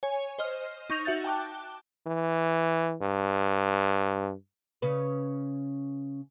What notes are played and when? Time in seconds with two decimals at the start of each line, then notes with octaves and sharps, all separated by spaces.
0.03 C#5 G#5
0.39 C5 D#5 F6
0.90 D#4 C#6 G6 A#6 F7
1.05 F#4 E5 G6 A6
1.24 G5 A5 D6 F#6
2.06 E3
3.01 G2
4.82 C#3 C#4 B4